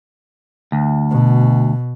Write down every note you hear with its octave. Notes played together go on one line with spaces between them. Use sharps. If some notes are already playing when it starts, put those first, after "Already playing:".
D2
B2